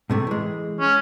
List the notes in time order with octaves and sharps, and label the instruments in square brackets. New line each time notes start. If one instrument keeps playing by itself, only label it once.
[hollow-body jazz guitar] A2 C3 A3
E3 G#3
[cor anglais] C#4